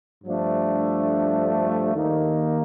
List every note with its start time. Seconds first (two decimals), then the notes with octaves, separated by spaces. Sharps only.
0.25 G2 F3 A3 D4
1.94 D#2 D#3 A#3 D#4